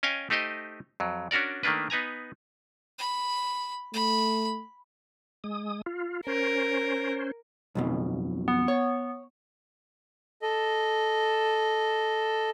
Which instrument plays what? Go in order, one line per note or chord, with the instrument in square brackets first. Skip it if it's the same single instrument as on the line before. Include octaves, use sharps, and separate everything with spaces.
[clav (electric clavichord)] C#4 D#5 F5 G5 G#5
A3 D#4 G4 C5 D#5
F2 F#3
C#4 D4 F#4 A#4 D5
D#3 A3 A#3 D4 B4
B3 D#4 B4 G#5 A#5
[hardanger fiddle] B5
[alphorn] A3 [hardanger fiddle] B5
[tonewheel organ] G#3 D#6
F4
[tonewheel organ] C#4 C5 [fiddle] A#4
[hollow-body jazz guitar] B1 F2 B2
[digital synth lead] B3
[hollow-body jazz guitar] C#5
[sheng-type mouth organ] A4 D#5